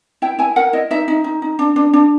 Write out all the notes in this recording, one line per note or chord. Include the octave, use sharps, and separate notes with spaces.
E4 G5
E4 G#5
A#4 F#5
E4 D#5
D#4 E5
D#4
D#4
D#4
D4
D4
D4